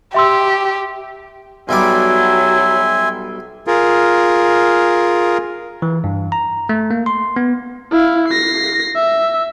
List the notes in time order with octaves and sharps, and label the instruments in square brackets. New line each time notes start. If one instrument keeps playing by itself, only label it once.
[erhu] G4 [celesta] E5 C6 E6
[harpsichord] B1 G3 D6 [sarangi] F#3 [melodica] E5 G#5 C6
[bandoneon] F4 G#4 A#4
[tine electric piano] E3
G2
A#5
A3
A#3
C6
B3
[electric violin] E4 F5
A#6 C7
E5